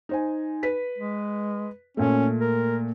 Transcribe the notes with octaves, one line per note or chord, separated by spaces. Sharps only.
D#4 C5 G#5
B4 B6
G#3
A#2 A3 C#4
A#4